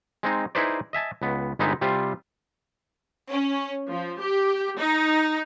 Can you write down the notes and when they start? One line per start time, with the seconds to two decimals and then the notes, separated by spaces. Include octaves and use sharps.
0.23 G#3 C4 D#4
0.55 D#4 E4 G#4 B4 C5 D5
0.93 D#5 E5 G#5 A5
1.22 C#2 B3
1.59 G1 G3 G#3 B3 D#4 E5
1.81 C3 G3 F4 C5
3.28 C#4
3.90 F3
4.18 G4
4.78 D#4